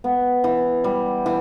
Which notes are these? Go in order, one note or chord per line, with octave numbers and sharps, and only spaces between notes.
B3
E3
G3
E3